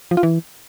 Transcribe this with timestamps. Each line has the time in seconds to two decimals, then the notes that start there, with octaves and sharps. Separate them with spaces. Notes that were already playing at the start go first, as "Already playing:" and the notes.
0.11 F3
0.17 F4
0.23 E3